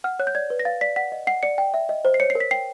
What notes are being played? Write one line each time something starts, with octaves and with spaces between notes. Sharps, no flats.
F#5 F6
C#5 F#6
G6
D5 G#6
B4
A#6
F5 A6
D5 B6
F#5 B6
D#5
F#5 C7
D5 C#7
G5
E5
D#5
C5
C7
C#5 C#7
C7
A#4
B6
G5 C7